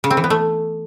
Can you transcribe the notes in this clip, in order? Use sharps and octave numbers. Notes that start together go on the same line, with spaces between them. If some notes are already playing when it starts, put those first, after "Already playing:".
C#3
C4
E3
B3
A3